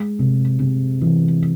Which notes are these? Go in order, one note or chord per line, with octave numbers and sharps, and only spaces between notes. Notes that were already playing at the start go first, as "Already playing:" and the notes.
Already playing: G#3
C3
C3
E3